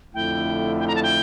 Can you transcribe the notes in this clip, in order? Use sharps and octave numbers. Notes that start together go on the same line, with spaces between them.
F2 D3 A3 E4 G5
G5
A#5
A5
G5